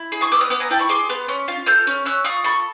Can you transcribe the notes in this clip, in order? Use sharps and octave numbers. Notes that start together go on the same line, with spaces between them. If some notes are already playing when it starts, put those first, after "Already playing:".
Already playing: E4
G#4
C#6 D#6
B3 D6 E6
D#6 F6
B3 D6 E6
G#5 A#5
E4 G5 A5
B5 C#6
G#4 C6 D6
B3
C#4
F4
A4 F6 G6
C#4
C#4 E6 F#6
F4 C#6 D#6
A4 B5 C#6